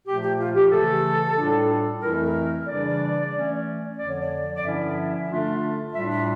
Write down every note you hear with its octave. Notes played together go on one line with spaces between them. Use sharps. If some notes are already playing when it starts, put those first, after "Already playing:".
A#2 F3 A3 G4
G4
F4
G4
C#3 E3 A3 A4
A2 G3 D4 F4
F2 E3 A3 E4 A#4
A4
A#4
C#3 E3 G3 D4 D5
E3 A3 C#4
F2 D3 F3 D5
C#5
D5
D5
G2 D3 F3 C#4 E4 E5
D3 A3 D4 F4
A2 G3 D4 F4 E5
E5